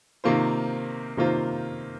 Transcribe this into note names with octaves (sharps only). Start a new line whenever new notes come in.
C3 D#3 A#3 F4 C5
C3 D#3 A#3 F4 C5